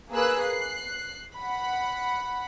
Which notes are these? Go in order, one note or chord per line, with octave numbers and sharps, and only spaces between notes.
A#3 G#4 B4 E6 F#6
F#6 C7
F#5 B5